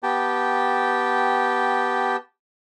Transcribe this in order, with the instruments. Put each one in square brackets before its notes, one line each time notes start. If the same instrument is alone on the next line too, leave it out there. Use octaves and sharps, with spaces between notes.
[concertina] B3 G4 G5 A5